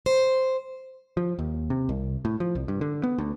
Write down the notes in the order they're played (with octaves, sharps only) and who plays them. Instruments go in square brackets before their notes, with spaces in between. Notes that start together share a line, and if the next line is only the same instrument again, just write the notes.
[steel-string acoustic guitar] C5
[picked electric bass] F3
D#2
C3
C2
A2
F3
C2
G2
D3
B3
D2